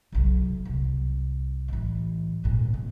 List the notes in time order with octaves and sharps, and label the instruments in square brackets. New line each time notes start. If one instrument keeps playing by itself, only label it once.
[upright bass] E1 B1
C2
A1 E3
G#1 A#2
C#3 C4